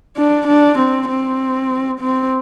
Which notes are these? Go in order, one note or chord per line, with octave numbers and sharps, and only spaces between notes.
D4
D4
C4
C4
C4